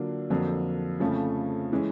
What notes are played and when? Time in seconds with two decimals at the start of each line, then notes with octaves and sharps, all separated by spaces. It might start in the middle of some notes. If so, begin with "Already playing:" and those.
Already playing: D3 F#3 A#3 D4 F4
0.30 F2 D3 F#3 A#3
1.00 F2 C#3 F3 A3 C#4
1.73 E3 G#3 C#4